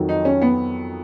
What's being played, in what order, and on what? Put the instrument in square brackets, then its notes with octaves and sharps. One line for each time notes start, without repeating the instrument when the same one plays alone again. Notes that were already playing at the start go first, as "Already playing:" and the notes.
Already playing: [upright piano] F2 D#3 F#3
[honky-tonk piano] D#4
C#4
B3